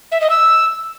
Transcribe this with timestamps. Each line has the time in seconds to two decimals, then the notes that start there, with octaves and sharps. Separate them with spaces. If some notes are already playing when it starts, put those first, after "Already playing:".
0.12 E5
0.21 D#5
0.30 E6